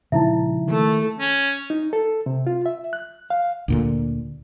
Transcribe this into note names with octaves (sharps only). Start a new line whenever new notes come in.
A#2 C#3 F3 G#3 D#4 E4 E5
D#3 A3 A4
C#4
D#4
A4
C3
F4
E5
F#6
F5
D2 A#2 D3